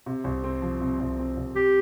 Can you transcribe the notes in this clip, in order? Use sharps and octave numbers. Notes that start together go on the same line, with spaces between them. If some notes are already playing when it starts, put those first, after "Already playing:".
C3
C2
C4
F3
C3
C2
C4
C2
C4 G4